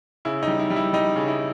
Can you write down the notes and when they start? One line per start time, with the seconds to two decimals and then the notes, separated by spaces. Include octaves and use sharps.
0.25 C#3 E4
0.43 D#4
0.48 G3
0.59 E4
0.70 G3
0.76 E4
0.93 G3 D#4
1.16 C#3
1.28 E4